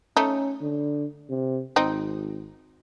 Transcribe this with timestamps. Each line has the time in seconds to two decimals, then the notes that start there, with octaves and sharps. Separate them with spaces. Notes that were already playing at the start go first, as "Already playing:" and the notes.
0.17 A3 C#4 D#4
0.61 D3
1.29 C3
1.76 G#1 C4 D#4